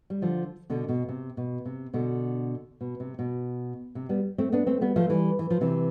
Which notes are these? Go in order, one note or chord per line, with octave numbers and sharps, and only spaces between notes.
G3
D3 F3
B2 D3
B2
C3
B2
C3
B2 D3
B2
C3
B2
C3
G3 B3
A3 C4
B3 D4
A3 C4
G3 B3
F3 A3
E3 G3
E3
F3
C3 E3